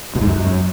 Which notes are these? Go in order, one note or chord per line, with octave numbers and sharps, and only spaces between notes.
B2
G#2
F#2